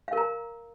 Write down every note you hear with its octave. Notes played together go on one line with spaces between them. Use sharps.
A#4 F5 A#5